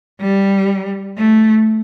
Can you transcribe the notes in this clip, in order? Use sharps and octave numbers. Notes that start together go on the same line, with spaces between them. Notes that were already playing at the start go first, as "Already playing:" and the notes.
G3
A3